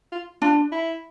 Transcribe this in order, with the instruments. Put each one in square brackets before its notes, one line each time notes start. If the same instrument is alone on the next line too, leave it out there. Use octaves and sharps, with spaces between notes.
[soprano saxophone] F4
[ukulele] D4 [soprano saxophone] F4
[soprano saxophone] E4